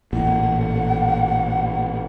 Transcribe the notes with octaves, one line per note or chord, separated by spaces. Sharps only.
A1 A#2 F#5